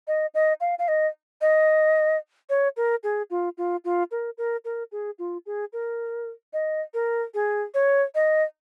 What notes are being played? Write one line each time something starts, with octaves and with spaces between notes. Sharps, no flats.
D#5
D#5
F5
F5
D#5
D#5
C#5
A#4
G#4
F4
F4
F4
A#4
A#4
A#4
G#4
F4
G#4
A#4
D#5
A#4
G#4
C#5
D#5